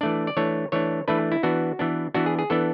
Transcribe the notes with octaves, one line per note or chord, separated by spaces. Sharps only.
E3 A3 D4 D5
D5
E3 A3 D4 C#5
E3 A3 D4 C#5
E3 A3 D4 B4
E4
E3 B3 D4 F#4
E3 B3 D4
E3 B3 D4 F#4
G#4
G#4
E3 B3 D4 A4